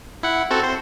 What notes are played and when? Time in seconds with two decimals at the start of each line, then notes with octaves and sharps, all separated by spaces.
0.23 E4 F#5
0.51 C4 F#4 A4
0.63 C5